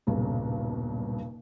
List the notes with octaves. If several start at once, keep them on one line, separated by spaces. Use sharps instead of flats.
D#1 B1 G2 C#3